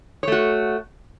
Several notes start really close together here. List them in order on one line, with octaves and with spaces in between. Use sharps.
C#5 A3 F#4